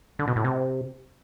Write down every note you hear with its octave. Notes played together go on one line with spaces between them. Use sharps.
D3
B2
A2
C3